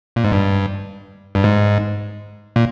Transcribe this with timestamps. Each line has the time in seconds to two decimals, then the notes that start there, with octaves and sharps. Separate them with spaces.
0.16 A#2
0.24 G#2
0.32 G2
1.35 G2
1.44 G#2
2.56 A#2